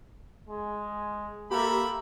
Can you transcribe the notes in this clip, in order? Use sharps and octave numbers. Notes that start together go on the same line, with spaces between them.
G#3
A#3 G4 A4 E5 A#5 B5